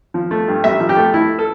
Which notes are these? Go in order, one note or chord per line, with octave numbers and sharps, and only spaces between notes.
F3
A3
G2
A1 E5
F3
G4
A3
A3 E4
A4